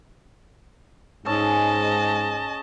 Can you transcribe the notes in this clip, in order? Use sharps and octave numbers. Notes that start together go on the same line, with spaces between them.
G#2 C#4 G#4 A4 D#5 A5